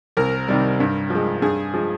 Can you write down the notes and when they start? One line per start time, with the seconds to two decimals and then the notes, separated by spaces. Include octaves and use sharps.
0.17 C2 A#4
0.48 C3 D#3 G3
0.80 G2
1.10 F3 G#3
1.42 G2 G#4
1.74 F3 G#3